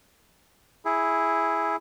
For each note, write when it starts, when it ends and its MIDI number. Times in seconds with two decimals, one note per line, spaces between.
0.85 1.76 64
0.85 1.76 68